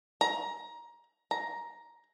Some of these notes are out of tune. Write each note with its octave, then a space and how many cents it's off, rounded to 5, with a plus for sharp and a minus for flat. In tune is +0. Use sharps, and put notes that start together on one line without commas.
A#5 +20
A#5 +10